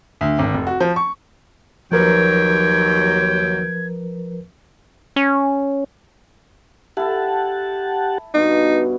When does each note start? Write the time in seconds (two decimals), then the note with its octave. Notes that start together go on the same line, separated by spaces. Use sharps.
0.21 D2
0.39 G#1
0.54 F1
0.67 F#4
0.80 F3
0.96 C#6
1.92 D#2 F3 F#3 A#4 B4 G5 G#6
5.16 C#4
6.97 E4 G4 A4 F#5 A5
8.34 G2 B2 D#4